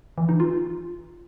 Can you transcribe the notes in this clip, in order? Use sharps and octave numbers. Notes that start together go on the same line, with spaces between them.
E3
D#4
F4